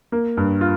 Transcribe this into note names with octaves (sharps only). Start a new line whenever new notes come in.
A#3
G2
F4